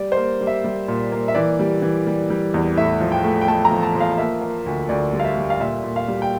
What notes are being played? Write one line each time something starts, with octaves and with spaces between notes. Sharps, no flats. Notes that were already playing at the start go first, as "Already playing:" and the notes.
Already playing: G3 D5
A#3 C5
G3
E5
G3
A#2
A#3
E5
E3 D5
G3
E3
G3
G3
E2
A2 E5
F3
G5
A3
G5
A3 A5
A#5
F3
A5
F3
F5
A#3 E5
A#3
D2
D2 D5
G3
F5
E5
G3
F5
A#2 E5
A#2
F5
G3
G5